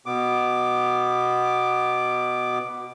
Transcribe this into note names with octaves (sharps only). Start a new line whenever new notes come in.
B2 B3 D6